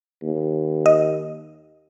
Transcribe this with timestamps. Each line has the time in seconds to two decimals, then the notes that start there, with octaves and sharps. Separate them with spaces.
0.22 D#2
0.86 D#5